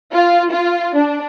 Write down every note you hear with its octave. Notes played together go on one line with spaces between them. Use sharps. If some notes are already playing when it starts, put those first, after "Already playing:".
F4
F4
D4